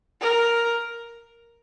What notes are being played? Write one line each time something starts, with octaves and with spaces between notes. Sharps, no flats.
A#4